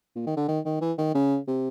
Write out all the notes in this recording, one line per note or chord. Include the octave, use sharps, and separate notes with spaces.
A#2
D#3
D3
D#3
D#3
E3
D#3
C#3
C3